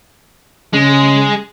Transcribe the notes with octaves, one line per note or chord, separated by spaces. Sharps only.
C#3 G#3